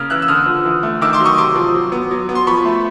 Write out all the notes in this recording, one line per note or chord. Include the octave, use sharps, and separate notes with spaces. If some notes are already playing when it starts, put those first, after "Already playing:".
Already playing: C#3 A#3 D#6 F6
E3 E6 F#6
E6
D3 D#6 F6
F3
E3
A3
D#3 D6 E6
C6 D6
F#3
C#6 D#6
C3 C6 D6
F3
F#3
B3
F#3
B3
C6
F3 B5 C#6
A3